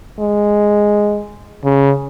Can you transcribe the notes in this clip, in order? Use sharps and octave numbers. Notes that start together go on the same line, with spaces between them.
G#3
C#3